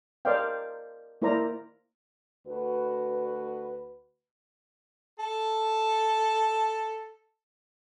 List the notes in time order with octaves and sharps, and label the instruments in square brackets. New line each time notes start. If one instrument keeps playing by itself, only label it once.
[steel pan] A#4 C5 D5 D#5 F5 G5
A#3 E4 A#4 C5 D5 A#5
[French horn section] D2 F#4 B4
[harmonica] A4 A5